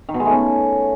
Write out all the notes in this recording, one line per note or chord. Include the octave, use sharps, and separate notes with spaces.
D#3
B2
G#3
A3
C#4